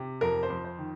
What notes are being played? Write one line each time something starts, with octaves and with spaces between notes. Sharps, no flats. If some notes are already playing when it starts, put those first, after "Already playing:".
Already playing: C3
F2 A#4
C5
F2
C5
D#3